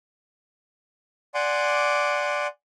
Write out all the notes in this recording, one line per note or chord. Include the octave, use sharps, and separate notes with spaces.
D5 F#5 G#5 C6 D6